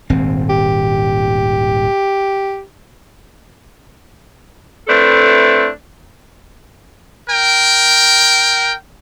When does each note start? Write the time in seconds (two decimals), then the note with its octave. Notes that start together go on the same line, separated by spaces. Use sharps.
0.10 D#1 G#1 C4
0.49 G4
4.88 A3 C4 D4 E4 A4 B4
7.30 A#4 G5